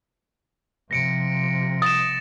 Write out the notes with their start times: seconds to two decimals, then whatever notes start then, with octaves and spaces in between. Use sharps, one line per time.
0.91 C3 F3 A#6 C#7 D7
1.82 D#6 A6 A#6 E7